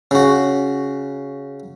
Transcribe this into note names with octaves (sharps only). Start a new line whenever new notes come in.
C#3 F#4